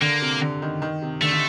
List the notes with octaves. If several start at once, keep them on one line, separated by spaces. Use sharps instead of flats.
D3 A#3
C3
D3
D#3
D#3
C3
D3 A3
D3